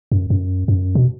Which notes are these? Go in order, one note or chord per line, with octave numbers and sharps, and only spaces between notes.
F#2
F#2
F#2
B2